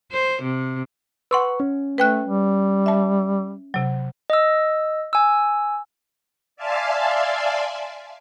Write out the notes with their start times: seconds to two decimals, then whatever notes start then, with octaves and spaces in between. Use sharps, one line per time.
0.11 C5
0.42 C3
1.31 B4 F#5 C6 C#6 E6
1.60 C#4
1.98 A3 B4 G5 F#6
2.26 G3
2.86 E5 A5
3.74 C3 F#3
4.30 D#5 E6
5.13 G#5 E6
6.56 D5 E5 F5 G#5 A5 C6